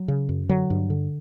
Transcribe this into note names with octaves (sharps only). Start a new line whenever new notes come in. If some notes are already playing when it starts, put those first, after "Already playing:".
Already playing: F#3
C#3
F#2
D3 F#3
G2
D3